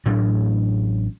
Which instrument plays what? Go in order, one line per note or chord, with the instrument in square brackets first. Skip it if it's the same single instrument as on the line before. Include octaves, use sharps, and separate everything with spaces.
[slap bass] A1 A2 F#3 D4